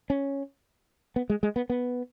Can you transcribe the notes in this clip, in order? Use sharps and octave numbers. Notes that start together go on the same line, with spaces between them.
C#4
B3
G#3
G#3
B3
B3